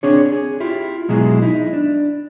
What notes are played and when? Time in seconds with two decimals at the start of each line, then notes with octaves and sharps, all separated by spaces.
0.03 C4 D4 G#4 C#5
0.32 G#4
0.60 E4 F4 G4
1.09 B2 F#3 G#3 E4 G#4
1.42 D#4 E4
1.73 D4